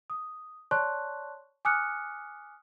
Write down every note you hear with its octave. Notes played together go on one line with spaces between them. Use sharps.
D#6
C#5 D5 A5 C6 C#6 F#6
G#5 D6 D#6 F6 F#6 C#7